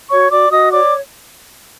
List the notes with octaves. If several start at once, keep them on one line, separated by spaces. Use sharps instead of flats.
F#4 C#5 C#6
F#4 D5 D6
F#4 D#5 D#6
C#5 D5 D6